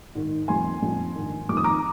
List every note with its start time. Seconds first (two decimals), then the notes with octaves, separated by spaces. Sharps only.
0.15 G#2 D#3
0.48 F2 D#3 G#5 C6
0.82 F2 D3
1.15 G#2 D#3
1.49 F2 D6
1.53 D#3 D#6
1.64 A#5 D6